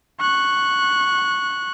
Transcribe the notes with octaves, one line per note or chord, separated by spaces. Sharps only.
C#6 F#6